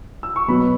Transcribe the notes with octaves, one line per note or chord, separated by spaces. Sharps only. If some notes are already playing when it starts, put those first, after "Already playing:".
E6
C#6
B2 F#3 B3 B5